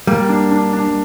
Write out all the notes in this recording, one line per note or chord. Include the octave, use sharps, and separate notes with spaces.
G3 A#3
D4
D4
D4